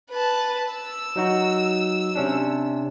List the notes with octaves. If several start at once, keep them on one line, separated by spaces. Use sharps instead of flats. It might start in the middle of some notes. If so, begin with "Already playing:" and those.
B4 A5
E6
F#3 D#4 F#4
C3 C#4 D4